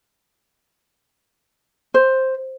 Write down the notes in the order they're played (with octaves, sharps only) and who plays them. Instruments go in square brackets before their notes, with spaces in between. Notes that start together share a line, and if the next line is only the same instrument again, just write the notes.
[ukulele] C5